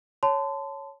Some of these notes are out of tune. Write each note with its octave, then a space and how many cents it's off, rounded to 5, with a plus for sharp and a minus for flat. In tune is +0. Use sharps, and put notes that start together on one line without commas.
C#5 +0 A5 +0 C6 -35